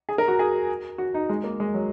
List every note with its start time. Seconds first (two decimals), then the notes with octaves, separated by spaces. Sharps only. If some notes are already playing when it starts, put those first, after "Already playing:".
0.09 G#4
0.18 A#4
0.28 F#4
0.39 G#4
0.98 F#4
1.14 D#4
1.29 G#3
1.44 A#3
1.60 G#3
1.74 F#3